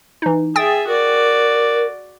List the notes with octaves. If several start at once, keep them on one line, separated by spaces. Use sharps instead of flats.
E3 D#4
G#4 E5 G5 D#6 A6
F#4 A#4 D5